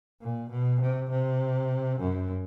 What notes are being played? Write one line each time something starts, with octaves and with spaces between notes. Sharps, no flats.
A#2
B2
C3
C3
F#2